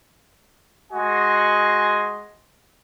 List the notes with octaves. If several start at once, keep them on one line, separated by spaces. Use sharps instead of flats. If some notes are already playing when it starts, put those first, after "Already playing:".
G#3 F#4 D#5 G#5 C6